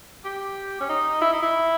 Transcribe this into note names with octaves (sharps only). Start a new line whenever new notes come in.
G4
C#4
D#4
E4
D#4
E4